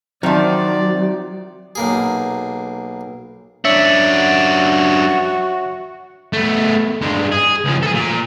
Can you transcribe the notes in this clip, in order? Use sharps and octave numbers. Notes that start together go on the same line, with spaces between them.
D#3 F3 F#3 C4 D#4 D5 E5
B1 A#3 G#4
F#2 D4 C#5 E5 C#7
F#4
A3 B3
G2 G#3
G#4
C#2 F3
G#4 A4
A#2